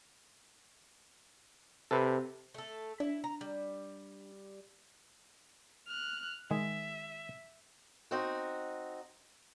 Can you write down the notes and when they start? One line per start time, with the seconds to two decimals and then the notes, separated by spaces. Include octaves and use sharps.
1.91 C3 A4 B4
2.54 A3 A4
3.00 D4 E4
3.24 A#5
3.41 G3
5.87 F6 F#6
6.51 D#3 G#3 G#4 E5
8.11 C4 D#4 F#4